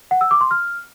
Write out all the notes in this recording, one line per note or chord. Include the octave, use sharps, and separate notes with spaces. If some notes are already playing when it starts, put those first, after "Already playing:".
F#5
E6
D6
C6
F6